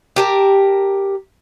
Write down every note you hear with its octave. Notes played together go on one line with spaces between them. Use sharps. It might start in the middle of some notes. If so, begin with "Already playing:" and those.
G4 A#4 A5